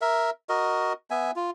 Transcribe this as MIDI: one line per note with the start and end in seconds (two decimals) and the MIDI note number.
0.01 0.30 70
0.01 0.30 76
0.49 0.93 66
0.49 0.93 70
0.49 0.93 75
1.10 1.31 59
1.10 1.31 76
1.10 1.31 80
1.36 1.51 65